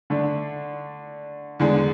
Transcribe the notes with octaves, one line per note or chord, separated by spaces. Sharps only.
D3 A3 D4
E2 D3 G#3 D4